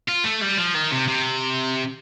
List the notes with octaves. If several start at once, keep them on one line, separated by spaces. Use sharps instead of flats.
F4
A3
G3
F3
D#3
C3
C3